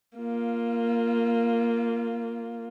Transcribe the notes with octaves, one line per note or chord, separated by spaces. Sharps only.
A#3 F4